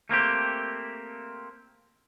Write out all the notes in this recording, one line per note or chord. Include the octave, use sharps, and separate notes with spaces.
A3 A#3 C4 G4